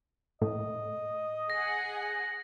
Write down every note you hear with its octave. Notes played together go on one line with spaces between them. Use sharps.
A2 D#5
G#4 F#5 A#6